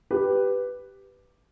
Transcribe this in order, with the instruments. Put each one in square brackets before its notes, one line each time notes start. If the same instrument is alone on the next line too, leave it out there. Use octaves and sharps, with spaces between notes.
[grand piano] G4 B4